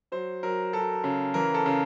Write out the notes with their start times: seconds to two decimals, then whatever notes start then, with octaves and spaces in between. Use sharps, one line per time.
0.12 F#3 C5
0.43 F#3 A#4
0.73 F#3 A4
1.04 C#3
1.34 E3 A#4
1.54 A4
1.66 C#3